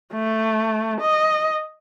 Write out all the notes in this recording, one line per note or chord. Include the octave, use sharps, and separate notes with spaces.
A3
D#5